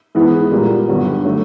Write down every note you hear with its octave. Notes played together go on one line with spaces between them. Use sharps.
G#2 E3 G#3 B3 E4
A#2 G3 A#3
G2 D3 F#3 B3
D3 F#3 A3